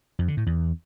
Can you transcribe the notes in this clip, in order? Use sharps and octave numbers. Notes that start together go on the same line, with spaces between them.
F2
D3
A2
E2